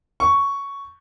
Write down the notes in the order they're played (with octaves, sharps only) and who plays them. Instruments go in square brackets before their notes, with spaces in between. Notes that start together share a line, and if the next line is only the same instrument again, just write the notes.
[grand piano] C#6